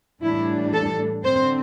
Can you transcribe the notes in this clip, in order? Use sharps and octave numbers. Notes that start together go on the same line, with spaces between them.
A2 E3 G3 D4 E4
A4
D3 C4 C5